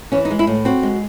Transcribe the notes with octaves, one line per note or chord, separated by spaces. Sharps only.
E3 C#4
D#4
G#3
E4
A2
C4 F#4
G#3